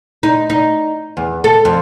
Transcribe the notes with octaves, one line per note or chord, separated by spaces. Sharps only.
D#4
D#4
E2
A4
F2